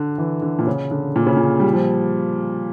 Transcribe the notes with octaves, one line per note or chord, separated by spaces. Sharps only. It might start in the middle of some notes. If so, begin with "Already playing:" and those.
Already playing: D3
E3
D3
A#2
C#3
D3
A#2
C#3
A#2
G3
F3